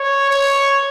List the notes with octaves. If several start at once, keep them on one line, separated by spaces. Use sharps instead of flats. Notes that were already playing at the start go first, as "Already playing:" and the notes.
Already playing: C#5
C#5